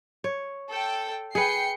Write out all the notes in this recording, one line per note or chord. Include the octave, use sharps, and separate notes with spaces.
C#5
A4 G5
G#4 B4 G5 C7 C#7